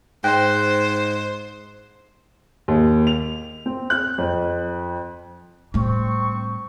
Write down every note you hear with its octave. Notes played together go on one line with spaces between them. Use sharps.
G#2 C5 G5 F#6
D#2
F7
C4
F#6
F2
A2 G3 C4 C#6